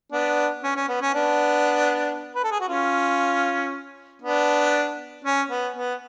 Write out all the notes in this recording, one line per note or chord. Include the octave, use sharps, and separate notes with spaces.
B3 D4
C#4
C#4
B3
C#4
B3 D4
B4
A4
G#4
F#4
C#4 F4
B3 D4
C#4
B3
B3